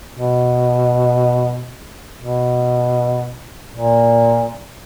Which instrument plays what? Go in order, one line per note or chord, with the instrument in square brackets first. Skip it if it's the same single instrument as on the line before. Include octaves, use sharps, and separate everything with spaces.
[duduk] B2
B2
A#2